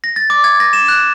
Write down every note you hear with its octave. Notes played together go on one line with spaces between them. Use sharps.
A#6
A6
D6
G#6
A#6
E7
F#6